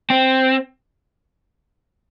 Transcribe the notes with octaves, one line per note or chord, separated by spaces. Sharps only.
C4